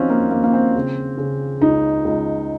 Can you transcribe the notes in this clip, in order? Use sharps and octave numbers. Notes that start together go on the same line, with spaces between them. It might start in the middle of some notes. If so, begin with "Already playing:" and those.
Already playing: D#2 F3 C4 C#4 D#4 F4 F#4
A#3
D#2 A#3
A#3
C4
C#3
C#3
C#2 D#4
C#2